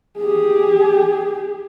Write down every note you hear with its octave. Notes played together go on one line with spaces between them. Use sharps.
G4 G#4